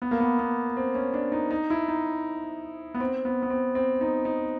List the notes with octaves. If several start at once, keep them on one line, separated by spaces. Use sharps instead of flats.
B3
A#3
B3
B3
C4
C#4
D4
D#4
D#4
E4
D#4
B3
C4
B3
B3
C4
C4
D#4
D#4